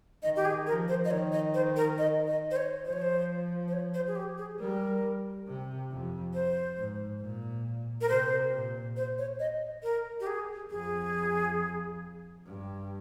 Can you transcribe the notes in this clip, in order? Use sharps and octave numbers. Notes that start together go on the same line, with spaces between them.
D#3 D#5
G4
G#4
F3 A#4
C5
D#5
D#3 C#5
D#5
C5
A#4
D#5
D#5
C5
C#5
F3 C5
C#5
C5
C5
C#5
C5
G#4
G4
G#4
G3 A#4
C3
F2
C5
G#2
A#2
A#4
C3 C5
A#2
C5
C#5
D#5
A#4
G4
G#4
F2 G#4
G2